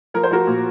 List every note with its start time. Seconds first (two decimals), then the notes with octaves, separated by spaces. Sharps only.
0.14 F3 A#4
0.23 C5
0.31 F3 F#4 A#4
0.47 A#2